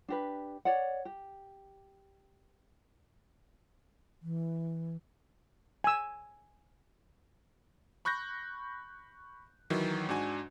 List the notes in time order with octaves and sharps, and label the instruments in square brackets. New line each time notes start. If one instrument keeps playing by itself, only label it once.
[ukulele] D4 G4 B4
C#5 D5 F#5
G4
[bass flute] E3
[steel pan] G#5 E6
[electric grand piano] B5 C#6 F#6 G6 A#6
D#3 E3 F#3
G#2 D4 F#4 G#5